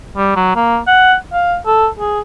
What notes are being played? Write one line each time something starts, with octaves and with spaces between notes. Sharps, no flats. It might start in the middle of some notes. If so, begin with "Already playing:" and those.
G3
F#3
A#3
F#5
F5
A4
G#4